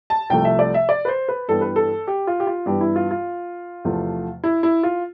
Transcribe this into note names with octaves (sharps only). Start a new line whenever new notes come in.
A5
C2 C3 F3 A3 G5
E5
D5
E5
D5
B4
C5
B4
G2 E3 G3 B3 A4
B4
A4
G4
F4
G4
F4
G2 E3 B3 G4
E4
F4
F4
E2 C3 F3 A3
E4
E4
F4